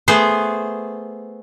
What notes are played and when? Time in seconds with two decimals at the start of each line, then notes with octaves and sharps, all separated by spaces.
0.08 A3 B3 G#4 C5